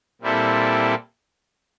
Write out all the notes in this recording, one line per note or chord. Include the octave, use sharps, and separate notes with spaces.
A#2 G3 C4 E4 A4